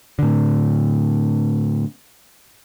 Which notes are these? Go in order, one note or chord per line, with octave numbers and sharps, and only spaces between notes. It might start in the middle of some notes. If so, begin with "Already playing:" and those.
A2 D3